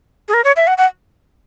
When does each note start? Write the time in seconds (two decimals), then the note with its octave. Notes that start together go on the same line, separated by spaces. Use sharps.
0.28 G#4
0.34 A#4
0.44 C#5
0.56 E5
0.67 F#5
0.78 F#5